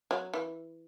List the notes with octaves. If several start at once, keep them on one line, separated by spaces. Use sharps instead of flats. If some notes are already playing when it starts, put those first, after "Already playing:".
F#3
E3